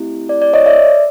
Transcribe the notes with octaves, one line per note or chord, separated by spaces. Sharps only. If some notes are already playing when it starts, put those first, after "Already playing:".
Already playing: A3 C4 E4 G4
D5
D5
C#5 D#5
D5 E5